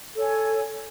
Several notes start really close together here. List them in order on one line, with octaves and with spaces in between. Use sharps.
A4 C#5 G#5